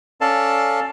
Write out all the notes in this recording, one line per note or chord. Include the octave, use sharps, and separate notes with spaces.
C#4 A4 D5 F5 A5